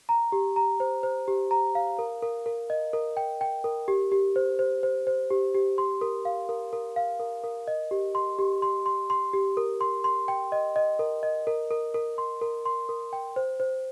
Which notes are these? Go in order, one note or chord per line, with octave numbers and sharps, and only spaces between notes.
A#5
G4
A#5
C5
C5
G4
A#5
F5
A#4
A#4
A#4
D#5
A#4
G5
G5
A#4
G4
G4
C5
C5
C5
C5
G4
G4
C6
A#4
F5
A#4
A#4
F5
A#4
A#4
D#5
G4
C6
G4
C6
C6
C6
G4
A#4
C6
C6
G5
D#5
D#5
A#4
D#5
A#4
A#4
A#4
C6
A#4
C6
A#4
G5
C5
C5